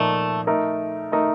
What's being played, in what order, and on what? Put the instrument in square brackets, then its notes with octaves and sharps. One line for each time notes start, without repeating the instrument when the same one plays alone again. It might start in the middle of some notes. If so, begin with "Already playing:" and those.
Already playing: [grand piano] A#2 F3 A#3 D#4 [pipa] A3
[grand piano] A3 D#4 A#4
A3 D#4 A#4